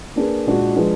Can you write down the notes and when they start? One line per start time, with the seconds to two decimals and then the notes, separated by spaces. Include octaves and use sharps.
0.16 A#3 D4 G#4 B4
0.46 A#2 G#3 D4 F#4
0.76 F3 G#3 D4 G#4 B4